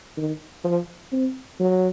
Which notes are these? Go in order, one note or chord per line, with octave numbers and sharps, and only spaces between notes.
D#3
F3
C4
F#3